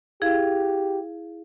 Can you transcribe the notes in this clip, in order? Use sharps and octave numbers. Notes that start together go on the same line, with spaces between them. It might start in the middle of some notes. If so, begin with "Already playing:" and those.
E4 G4 G#4 F5